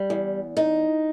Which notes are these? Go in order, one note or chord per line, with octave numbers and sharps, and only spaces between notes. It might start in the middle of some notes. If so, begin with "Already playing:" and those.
Already playing: G3
E2
D#4